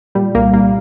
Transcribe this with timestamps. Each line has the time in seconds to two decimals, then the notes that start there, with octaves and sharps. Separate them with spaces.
0.15 A#2 G3
0.35 C2 A#3
0.54 C2 A#3